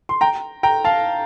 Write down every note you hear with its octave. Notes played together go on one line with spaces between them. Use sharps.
C6
G5 A#5
G5 A#5
F5 A5